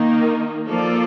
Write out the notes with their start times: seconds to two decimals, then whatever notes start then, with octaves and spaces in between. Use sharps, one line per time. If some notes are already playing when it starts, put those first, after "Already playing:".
Already playing: D#3 A#3 D#4
0.68 F3 A#3 F4 A4 D5